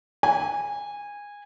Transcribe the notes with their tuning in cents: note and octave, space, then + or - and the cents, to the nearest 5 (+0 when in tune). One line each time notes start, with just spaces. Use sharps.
G#5 -20